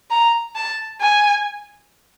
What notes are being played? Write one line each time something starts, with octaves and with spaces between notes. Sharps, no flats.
A#5
A5
G#5